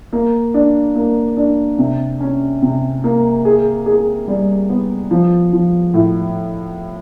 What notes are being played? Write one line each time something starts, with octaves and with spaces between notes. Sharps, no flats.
A#3
D4
A#3
D4
C3
C#4
C3
A#3
G#4
G#4
G3
B3
F3
F3
A2